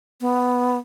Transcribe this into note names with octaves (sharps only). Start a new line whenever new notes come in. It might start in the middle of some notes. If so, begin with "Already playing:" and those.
B3